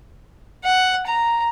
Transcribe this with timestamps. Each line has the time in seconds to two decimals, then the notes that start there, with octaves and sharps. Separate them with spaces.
0.64 F#5
1.06 A#5